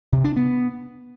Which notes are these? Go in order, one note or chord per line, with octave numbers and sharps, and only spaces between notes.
C3
D4
B3